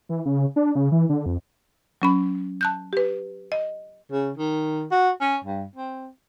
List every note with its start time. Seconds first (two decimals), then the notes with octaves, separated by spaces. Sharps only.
0.09 E3
0.26 C#3
0.56 D4
0.75 C#3
0.92 E3
1.09 D3
1.26 F2
2.02 F#3 C#4 B5
2.61 A5 F#6 G6
2.93 G4 B4
3.52 D#5
4.12 C#3
4.37 D#3
4.91 F#4
5.21 C#4
5.44 G2
5.75 C4